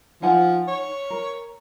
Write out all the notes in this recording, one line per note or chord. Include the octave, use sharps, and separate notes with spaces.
F3 D#4 F#5 G#5
C#5
A#4